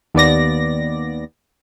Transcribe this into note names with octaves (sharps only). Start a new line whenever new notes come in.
D#2 B3 D5 A#6